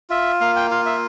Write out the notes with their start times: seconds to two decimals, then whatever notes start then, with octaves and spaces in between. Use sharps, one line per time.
0.10 F4 E5
0.41 A#3 F5
0.56 G5
0.71 F4 F5
0.86 E5